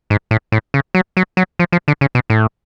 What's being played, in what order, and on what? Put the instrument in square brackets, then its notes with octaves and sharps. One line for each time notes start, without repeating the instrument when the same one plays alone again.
[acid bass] G#2
A2
A2
C#3
F#3
F#3
F#3
F3
F3
D3
C#3
B2
A2